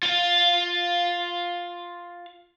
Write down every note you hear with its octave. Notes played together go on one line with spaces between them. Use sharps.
F4 F5